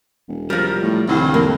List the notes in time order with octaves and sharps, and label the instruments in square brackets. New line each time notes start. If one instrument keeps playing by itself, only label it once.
[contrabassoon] E1
[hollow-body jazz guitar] F3 G3 [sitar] A#4
[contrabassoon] A2
[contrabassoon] C2 [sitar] G2 D3
[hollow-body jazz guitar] F2 [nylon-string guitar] A#3